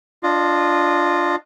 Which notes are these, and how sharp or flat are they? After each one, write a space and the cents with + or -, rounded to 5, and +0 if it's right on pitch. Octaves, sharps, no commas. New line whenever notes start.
D4 -5 F4 +0 D#5 -30